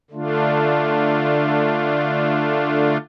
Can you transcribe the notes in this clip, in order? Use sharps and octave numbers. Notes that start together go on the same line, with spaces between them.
D3 A3 D4 F4